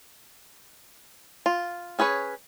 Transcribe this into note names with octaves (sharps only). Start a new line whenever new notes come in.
F4
C#4 G#4 B4 C#5